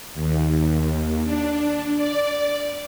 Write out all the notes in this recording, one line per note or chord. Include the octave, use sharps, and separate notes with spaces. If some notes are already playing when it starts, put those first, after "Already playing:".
D#2
D4
D5